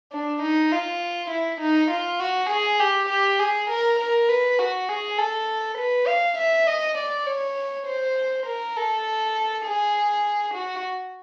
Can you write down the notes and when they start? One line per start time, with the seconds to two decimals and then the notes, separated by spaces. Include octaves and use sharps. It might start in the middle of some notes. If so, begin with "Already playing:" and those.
0.12 D4
0.42 D#4
0.71 F4
1.30 E4
1.61 D#4
1.91 F4
2.20 F#4
2.49 G#4
2.80 G4
3.09 G4
3.39 G#4
3.70 A#4
3.99 A#4
4.29 B4
4.59 F#4
4.88 G#4
5.18 A4
5.78 B4
6.07 F5
6.38 E5
6.67 D#5
6.98 D5
7.26 C#5
7.86 C5
8.46 A#4
8.76 A4
9.65 G#4
10.54 F#4